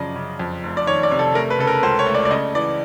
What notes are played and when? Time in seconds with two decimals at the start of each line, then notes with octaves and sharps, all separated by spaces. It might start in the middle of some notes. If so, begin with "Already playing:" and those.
Already playing: F#2 C#3 F3 D5 D#5
0.16 C#3
0.39 F2
0.63 F1
0.77 D5
0.87 D#3 C#5
1.03 D5
1.11 C3
1.19 A4
1.35 A3 A#4
1.50 B4
1.59 C#3 A4
1.67 A#4
1.83 C#2 C5
1.99 C#5
2.06 A3
2.14 D5
2.25 D5
2.30 C#3 D#5
2.55 E3 D5